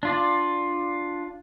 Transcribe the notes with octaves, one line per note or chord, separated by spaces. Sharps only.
D4 F4 D5